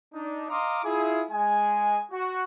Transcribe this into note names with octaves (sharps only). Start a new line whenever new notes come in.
D4 D#4
D#5 F5 A#5 C6 D6 D#6
E4 F4 G#4
G#3 G#5
F#4